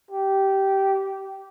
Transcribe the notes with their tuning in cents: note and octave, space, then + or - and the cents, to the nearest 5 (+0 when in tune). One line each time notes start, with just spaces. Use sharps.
G4 -15